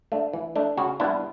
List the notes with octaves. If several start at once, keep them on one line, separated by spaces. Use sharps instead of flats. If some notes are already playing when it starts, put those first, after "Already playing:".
A3 D4
E3
A3 D4
C#3 F#4
G3 B3 D4 E4